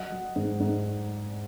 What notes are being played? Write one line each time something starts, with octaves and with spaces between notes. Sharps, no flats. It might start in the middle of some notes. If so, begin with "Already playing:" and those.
Already playing: F#3 D#5 F#5
F#3
G#2
G#2